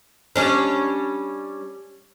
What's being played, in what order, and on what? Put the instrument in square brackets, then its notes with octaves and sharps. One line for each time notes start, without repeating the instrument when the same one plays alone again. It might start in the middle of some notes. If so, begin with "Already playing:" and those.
[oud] G3 C#4 D4